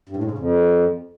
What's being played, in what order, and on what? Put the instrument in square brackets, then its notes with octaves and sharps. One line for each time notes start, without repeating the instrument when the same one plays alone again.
[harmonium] G2
A2
G#2
C#3
F2